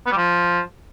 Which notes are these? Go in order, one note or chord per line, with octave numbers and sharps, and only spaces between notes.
B3
G3
F3